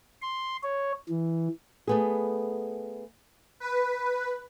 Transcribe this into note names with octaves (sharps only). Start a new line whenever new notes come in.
C6
C#5
E3
A3 B3 G#4
B4